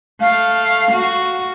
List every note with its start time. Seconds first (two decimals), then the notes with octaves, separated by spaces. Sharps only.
0.21 A3 F5
0.92 F#4